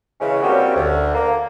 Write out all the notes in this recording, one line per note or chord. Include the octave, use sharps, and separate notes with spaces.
C#3 E3 G#3 C#4
G3 A#3 C4 C#4 F#4 G4
D2
A#3